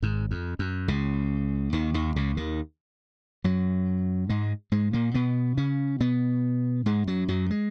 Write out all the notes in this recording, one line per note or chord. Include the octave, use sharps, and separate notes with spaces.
G#1 G#2
F2
F#2
C#2 C#3
D#2 D#3
D#2 D#3
C#2 C#3
D#2 D#3
F#2 F#3
G#2 G#3
G#2 G#3
A#2 A#3
B2 B3
C#3 C#4
B2 B3
G#2 G#3
F#2 F#3
F#2 F#3
G#3